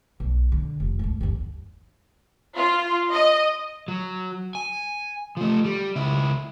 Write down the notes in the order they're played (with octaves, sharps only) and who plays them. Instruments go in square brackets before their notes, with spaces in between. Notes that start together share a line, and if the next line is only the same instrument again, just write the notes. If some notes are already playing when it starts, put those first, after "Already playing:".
[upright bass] B1
D3
F1
D2 G#2
G1 D#2
[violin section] F4
D#5
[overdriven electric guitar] F#3
G#5
F3 A3
G3
C#2 E4